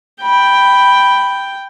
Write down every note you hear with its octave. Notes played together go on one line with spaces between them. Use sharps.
G5 B5